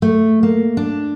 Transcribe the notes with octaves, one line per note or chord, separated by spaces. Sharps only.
A3
A#3
D4